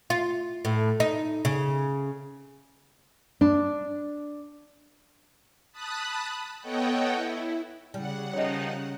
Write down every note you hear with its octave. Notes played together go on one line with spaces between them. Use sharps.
F4
A2
D#4
C#3
D4
A5 B5 D#6 F#6
B3 A4 C#5 D#5 F#5 G5
E4
C#3 G3 F#5
D#3 F3 D#4 C#5 D#5